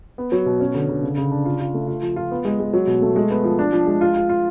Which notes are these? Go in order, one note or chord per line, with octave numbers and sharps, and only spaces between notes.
B3
F#3
B2
C#4
D3
D3
C#3
C#3
D4
F4
F4
A3
F4
F3
F4
B3
G#3
G#3
F#3
B2
A3
G#3
B3
F3
D4
F3
G#3
F4
F4
F4